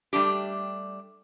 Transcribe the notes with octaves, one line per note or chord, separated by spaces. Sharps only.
G3 A3 D4 G4